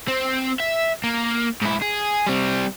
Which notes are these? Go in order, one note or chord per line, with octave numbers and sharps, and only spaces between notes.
C4
E5
A#3
G#2 E4
G#4
G3 C4